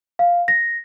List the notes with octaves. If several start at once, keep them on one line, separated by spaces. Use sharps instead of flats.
F5
A#6